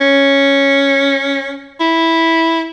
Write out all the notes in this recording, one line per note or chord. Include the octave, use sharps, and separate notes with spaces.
C#4
E4